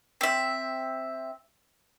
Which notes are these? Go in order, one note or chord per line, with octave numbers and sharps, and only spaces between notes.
C4 E5